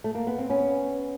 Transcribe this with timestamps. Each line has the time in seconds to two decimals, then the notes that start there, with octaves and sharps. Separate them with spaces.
0.04 A3
0.15 A#3
0.27 B3
0.38 C4
0.50 B3 C#4